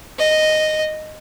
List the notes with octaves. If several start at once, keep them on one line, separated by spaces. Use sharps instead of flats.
D#5